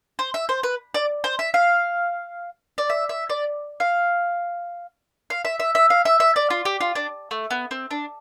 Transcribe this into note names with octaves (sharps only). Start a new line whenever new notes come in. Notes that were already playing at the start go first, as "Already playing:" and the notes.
C5
E5
C5
B4
D5
C5
E5
F5
D5
E5
E5
D5
F5
F5
E5
E5
E5
F5
E5
E5
D5
F4
G4
F4
D4
A3
B3
C4
D4